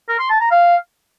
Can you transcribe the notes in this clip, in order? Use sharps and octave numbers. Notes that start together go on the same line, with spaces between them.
A#4
C6
A5
A#5
F5